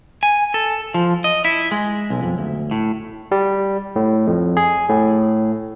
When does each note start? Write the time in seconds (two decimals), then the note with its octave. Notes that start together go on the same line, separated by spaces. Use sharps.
0.23 G#5
0.54 A4
0.94 F3
1.24 D#5
1.45 E4
1.71 G#3
2.10 B1
2.23 F2
2.38 D2
2.71 A2
3.31 G3
3.96 A2
4.27 F2
4.57 G#4
4.90 A2